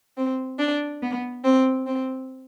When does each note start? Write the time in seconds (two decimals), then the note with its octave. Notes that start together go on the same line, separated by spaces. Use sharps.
0.16 C4
0.58 D4
1.01 B3
1.43 C4
1.86 C4